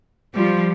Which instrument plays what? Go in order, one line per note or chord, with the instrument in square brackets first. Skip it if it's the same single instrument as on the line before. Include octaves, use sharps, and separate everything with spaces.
[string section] F3 [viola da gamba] G3